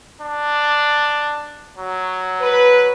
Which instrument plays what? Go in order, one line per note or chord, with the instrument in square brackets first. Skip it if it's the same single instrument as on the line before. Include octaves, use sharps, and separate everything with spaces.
[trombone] D4
F#3
[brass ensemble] B4